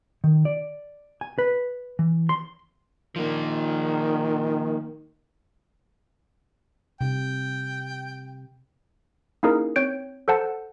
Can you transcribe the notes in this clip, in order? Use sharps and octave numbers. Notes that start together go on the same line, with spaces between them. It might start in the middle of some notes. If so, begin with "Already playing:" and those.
D#3
D5
G#5
B4
E3
C6
D#3 F3 A#3
C3 G5
A#3 C#4 D#4 E4 G#4 A#4
C4 C#5 G6 D7
A4 C5 F#5 A5